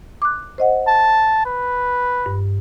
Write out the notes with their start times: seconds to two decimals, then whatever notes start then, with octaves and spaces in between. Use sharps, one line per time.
0.22 D6 F#6
0.58 C5 D#5 F#5
0.87 A5
1.46 B4
2.26 G2